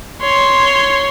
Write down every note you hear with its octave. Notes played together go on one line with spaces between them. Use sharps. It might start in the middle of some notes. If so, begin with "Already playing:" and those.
C#5 C6